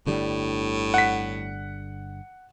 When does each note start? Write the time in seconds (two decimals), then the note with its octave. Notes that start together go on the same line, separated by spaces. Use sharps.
0.07 G1 A2 D3 G3
0.94 F#5 B6